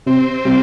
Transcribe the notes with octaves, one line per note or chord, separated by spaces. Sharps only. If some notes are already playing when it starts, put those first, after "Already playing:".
C3 C4
C3 G3